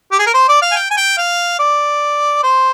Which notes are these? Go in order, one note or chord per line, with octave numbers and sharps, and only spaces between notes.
G4
G#4
A#4
C5
D5
F5
G#5
G5
G#5
G5
F5
D5
C5